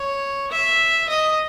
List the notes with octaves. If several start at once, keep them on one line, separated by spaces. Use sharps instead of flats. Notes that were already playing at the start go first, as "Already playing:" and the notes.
Already playing: C#5
E5
D#5